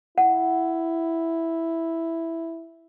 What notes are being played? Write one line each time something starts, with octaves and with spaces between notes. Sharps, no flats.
E4 F#5